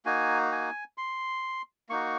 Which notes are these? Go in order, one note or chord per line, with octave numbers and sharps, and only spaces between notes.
A#3 D#4 F#4 G#5
G#5
C6
A#3 D#4 F#4 C#6